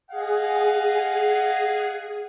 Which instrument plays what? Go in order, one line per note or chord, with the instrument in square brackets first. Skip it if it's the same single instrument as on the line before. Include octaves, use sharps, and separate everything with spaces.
[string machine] G#4 [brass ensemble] D#5 F5 F#5